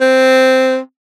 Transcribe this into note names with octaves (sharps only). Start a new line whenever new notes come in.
C4